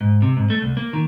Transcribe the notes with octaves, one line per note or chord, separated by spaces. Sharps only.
G#2
C3
G#2
A3
C2
A#3
D#3